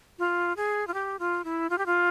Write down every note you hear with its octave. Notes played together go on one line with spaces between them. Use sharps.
F4
G#4
F4
G4
F4
E4
F4
G4
F4